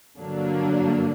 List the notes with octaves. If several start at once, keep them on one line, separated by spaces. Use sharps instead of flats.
G2 D3 F#3 A#3 D4